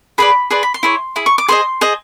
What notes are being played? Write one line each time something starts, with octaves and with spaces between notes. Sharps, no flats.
G#4 B4 D5 B5
G#4 B4 D5 C6
B5
C6
E4 G#4 C#5
E4 G#4
C#6
D6
G#4 C5 D#5 C6
G#4 C5 D#5